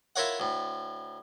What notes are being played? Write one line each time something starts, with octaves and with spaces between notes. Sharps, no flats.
E4 F4 A#4 C#5 F5 F#5
D2 A2